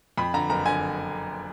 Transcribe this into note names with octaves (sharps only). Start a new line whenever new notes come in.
F2 B5
D3 A#5
F#1 A#5
D3 G#5